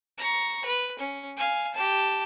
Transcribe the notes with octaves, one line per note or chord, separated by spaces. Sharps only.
A#5 C#6
B4
C#4
F5 G#5
G4 A5